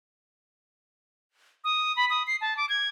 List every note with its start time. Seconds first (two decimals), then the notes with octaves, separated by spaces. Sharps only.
1.64 D#6
1.97 B5
2.10 D#6
2.27 C7
2.41 A5
2.57 D6
2.69 G#6